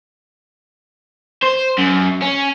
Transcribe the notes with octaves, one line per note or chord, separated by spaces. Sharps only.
C5
F#2
C#4